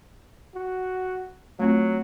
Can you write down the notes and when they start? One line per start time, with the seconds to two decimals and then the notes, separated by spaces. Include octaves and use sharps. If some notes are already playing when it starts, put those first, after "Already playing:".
0.55 F#4
1.60 F#3 A3 C4 F4